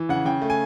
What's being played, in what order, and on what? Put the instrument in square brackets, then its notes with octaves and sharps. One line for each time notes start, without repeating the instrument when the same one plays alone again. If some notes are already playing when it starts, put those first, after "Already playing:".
Already playing: [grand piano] E3
C#3 F#5
C#3 G5
A3
G#5